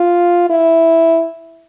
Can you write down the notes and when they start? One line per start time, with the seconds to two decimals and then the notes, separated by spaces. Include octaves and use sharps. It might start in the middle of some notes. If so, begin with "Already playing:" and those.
Already playing: F4
0.50 E4